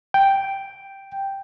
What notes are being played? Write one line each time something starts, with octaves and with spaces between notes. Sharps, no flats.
G5